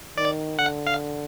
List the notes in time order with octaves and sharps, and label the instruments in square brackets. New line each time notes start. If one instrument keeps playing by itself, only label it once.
[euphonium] D#3 [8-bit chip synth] D5
[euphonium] D3 [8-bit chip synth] F#5
[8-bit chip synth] F5